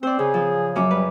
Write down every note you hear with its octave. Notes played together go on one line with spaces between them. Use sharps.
C4 C5 D5
C#3 G#4
F3
F#2 C#4 D6
G3 B4